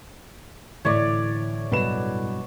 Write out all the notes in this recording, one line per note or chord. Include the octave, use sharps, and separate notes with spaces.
A2 D3 E3 C#5 D5
G2 B2 F#3 B4 E7